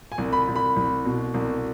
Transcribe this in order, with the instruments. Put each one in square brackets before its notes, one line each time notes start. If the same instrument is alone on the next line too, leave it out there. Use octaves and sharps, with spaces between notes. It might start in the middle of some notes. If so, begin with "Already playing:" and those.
[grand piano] G#5
C2
B5
C2
B5
C2
B2
C2